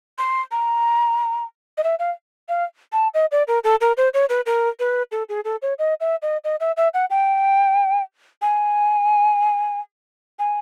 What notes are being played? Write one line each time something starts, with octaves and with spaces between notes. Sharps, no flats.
C6
A#5
D#5
E5
F5
F5
A5
D#5
D5
A#4
A4
A#4
C5
C#5
B4
A#4
B4
A4
G#4
A4
C#5
D#5
E5
D#5
D#5
E5
E5
F#5
G5
G#5
G#5